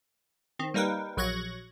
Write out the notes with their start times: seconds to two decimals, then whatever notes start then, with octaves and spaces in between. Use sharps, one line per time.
0.59 D#3 C4
0.74 G3 A#3 D#4 A#4 B4 G5
1.17 A#1 F#3 C#6 F#6 G#6 A#6